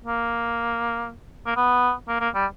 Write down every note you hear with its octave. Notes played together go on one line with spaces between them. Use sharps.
A#3
A#3
B3
A#3
A#3
G3